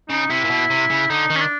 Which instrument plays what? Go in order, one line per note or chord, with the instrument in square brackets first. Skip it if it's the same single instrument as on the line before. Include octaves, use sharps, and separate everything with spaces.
[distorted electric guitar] C#3 [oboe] D#4
[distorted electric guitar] C3 [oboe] E4
[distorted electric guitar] A#2
B2
C3
C#3
[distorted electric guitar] D3 [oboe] D#4
[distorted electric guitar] D#3
[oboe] C#4
D4